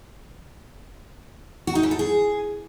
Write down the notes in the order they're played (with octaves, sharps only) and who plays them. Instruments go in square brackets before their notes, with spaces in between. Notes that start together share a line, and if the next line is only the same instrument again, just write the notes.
[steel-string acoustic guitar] F#4
D#4
E3
A4
G#4